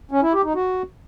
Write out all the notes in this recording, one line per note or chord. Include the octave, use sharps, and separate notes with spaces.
C#4
E4
G4
D#4
F#4